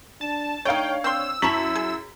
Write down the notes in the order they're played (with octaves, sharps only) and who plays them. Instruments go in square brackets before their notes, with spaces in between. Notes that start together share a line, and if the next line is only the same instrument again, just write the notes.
[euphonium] D4 [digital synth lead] A5
[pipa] A3 D#4 [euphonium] D4 [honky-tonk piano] C#5 F5 [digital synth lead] G5
[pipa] C4 G5 C6 [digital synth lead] E6
[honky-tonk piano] F#2 B6 F#7 [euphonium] E4 [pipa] A5 A#5 C#6
[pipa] G#4